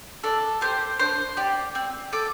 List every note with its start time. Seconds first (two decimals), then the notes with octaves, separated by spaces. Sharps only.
0.24 D4 A4
0.61 G4 C5
0.99 D4 C5
1.37 G4 D5
1.75 C4
2.13 A4 D6